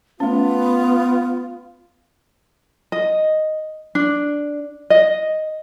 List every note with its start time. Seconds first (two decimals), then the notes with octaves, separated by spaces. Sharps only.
0.20 A3 B3 C#4 F4
2.92 D#5
3.95 D4
4.90 D#5